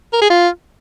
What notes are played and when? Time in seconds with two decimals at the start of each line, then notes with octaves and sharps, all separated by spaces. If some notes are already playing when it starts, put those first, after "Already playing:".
0.13 A#4
0.22 G#4
0.30 F4